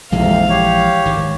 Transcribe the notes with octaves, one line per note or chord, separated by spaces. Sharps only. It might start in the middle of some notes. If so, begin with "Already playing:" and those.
A#1 F2 G#2 C3 E3 G#3 F5
G4 C#5
G#1 D#3